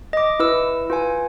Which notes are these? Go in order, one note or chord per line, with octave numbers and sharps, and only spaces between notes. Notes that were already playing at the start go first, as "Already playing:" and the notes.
D#5 D6
E4 B4 E6
F4 B4 G#5